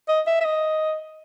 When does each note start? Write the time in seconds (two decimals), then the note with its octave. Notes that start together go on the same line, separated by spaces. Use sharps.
0.08 D#5
0.27 E5
0.41 E5
0.45 D#5